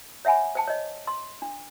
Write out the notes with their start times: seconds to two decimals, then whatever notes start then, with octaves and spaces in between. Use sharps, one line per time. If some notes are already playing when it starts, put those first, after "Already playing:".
0.25 C#5 E5 F#5 G#5 B5
0.55 C5 G5 A5
0.68 C#5 D#5
1.07 C6
1.42 D4